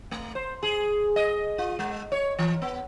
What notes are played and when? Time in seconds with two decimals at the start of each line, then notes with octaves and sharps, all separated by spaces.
0.11 A3
0.35 C5
0.63 G#4
1.16 D#5
1.58 F4
1.79 G#3
2.12 C#5
2.39 E3
2.62 B3